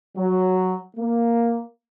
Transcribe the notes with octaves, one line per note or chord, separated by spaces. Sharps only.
F#3
A#3